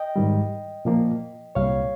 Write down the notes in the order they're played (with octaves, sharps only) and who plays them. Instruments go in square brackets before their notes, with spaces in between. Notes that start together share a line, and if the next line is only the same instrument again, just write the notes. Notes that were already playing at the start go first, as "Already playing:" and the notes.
Already playing: [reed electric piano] D#5 G5
G#2 D#3 G3
A#2 F3 A#3
C2 A#2 G3 C#5 F5